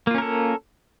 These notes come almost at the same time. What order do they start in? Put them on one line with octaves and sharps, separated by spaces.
A#3 F4 C#4 A#4 A4